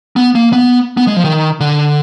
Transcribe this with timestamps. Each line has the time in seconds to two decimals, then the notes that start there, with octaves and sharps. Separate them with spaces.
0.16 B3
0.35 A#3
0.53 B3
0.97 B3
1.07 G#3
1.16 F3
1.24 D#3
1.60 D3